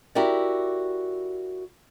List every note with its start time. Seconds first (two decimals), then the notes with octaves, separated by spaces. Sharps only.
0.15 E4 F#4 G4 A#4 D5